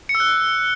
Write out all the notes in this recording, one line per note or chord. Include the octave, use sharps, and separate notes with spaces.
C#7
E6
F#6